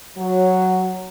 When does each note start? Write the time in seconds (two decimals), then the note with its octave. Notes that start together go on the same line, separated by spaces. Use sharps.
0.17 F#3